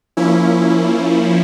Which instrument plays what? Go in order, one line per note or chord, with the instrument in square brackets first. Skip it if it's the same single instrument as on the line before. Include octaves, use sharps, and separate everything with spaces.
[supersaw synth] F3 A#3 C#4 E4